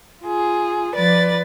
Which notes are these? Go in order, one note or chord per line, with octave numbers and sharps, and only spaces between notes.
F4 G#4
F3 B4 D5 A6